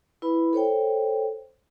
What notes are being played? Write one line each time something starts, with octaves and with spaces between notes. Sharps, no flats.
E4 B4 B5
A4 C5 C#5 G5